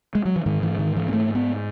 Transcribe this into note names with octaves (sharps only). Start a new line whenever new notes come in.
G#3
F#3
E3
G#2 D#3
E3
D#3
E3
B3
A3
B3